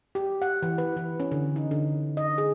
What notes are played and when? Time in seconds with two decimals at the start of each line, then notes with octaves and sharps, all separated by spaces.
0.15 G4
0.42 F#5
0.63 E3
0.78 B4
0.97 E3
1.20 C#4
1.32 D3
1.56 D#4
1.71 D3
2.17 D#5
2.38 G#4